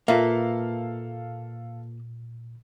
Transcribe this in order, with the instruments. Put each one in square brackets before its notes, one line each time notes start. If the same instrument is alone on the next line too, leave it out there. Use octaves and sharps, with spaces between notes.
[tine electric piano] A#2 [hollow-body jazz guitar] A#3 [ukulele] F4 B4 E5 [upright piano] A4 F5